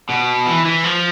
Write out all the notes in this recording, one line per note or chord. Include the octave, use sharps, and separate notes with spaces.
B2
E3
E3
F3